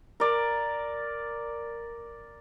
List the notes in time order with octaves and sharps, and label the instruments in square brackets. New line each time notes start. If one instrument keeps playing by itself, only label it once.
[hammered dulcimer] A#4 D5